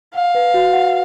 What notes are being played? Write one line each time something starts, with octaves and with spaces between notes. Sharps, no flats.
F5 F#5
B4
F#4
F#5